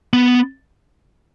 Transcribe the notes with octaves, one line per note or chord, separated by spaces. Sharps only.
B3